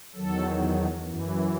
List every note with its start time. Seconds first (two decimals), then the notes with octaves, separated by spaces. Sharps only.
0.15 E2 D#3 F#3 A4
1.05 F#2 E3